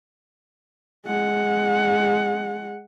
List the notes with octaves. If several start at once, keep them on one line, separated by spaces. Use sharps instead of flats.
G#3 F#5